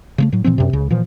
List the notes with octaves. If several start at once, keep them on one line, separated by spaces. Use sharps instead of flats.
C#3 G#3 A3
A2 F#3
A#2 E3 F3 C4
F#2 C3
C#2 C#3
A#2 E3 F3